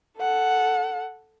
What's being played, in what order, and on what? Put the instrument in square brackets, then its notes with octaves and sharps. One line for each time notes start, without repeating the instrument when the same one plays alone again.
[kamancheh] A4 F#5